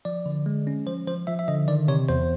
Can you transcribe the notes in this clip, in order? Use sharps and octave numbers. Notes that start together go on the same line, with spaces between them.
F3 D5
D3
G#3
C#4
F3 C5
F3 C5
F3 E5
E5
D3 D#5
D#3 D5
C3 C#5
E2 C5